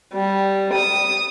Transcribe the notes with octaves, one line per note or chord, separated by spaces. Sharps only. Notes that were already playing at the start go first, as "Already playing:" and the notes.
G3
D#6